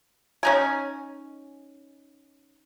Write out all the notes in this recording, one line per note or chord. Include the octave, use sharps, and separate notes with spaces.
C#4 D#4 G#5